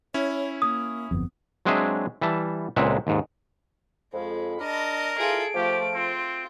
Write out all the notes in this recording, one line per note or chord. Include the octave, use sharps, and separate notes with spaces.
C#4 E4 C#5
A#3 D#6
G1 F2 B3
F#3 G#3 C4 D4 G#4 E5
E3 G3 E5 A5
C#2 A#2 G#3 C4 E5 F#5
D#2 G#2
F2 G#3 B5
D4 A#4 D#5 A5
G2 E4 F4 G#4 A4 D7
F3 A3 G4
C4 F4